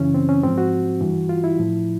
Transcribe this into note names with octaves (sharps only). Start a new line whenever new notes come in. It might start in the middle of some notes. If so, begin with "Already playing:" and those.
Already playing: F#2 C#3 E3 C#4
C4
C#4
G#2 F3 C4
F#4
G2 E3
F4
E4
A2 F3